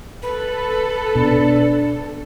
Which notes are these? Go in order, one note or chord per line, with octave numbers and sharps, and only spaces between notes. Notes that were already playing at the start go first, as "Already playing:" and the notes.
A4 B4
B2 D4